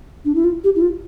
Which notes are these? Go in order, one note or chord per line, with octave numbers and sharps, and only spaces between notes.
D4
E4
F4
G4
E4
F4